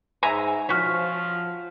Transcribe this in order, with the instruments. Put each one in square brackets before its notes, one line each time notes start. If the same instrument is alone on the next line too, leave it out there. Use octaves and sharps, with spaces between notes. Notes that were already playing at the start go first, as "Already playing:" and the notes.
[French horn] G#2 [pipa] E5 G#5 A#5
[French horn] F3 [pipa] C#4 F#4 [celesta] F6 B6